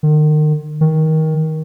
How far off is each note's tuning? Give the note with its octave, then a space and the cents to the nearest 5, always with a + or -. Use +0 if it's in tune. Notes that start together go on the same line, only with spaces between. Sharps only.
D#3 -35
D#3 +20